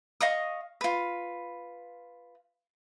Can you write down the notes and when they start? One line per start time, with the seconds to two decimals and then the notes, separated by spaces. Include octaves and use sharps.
0.21 D#5 F5 C#6 D#6
0.81 F4 B4